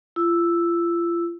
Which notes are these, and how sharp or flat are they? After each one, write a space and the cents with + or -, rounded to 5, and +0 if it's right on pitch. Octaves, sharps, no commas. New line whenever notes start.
F4 -35 E6 +0